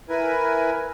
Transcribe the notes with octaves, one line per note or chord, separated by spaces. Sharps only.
E4 A#4 B4 G#5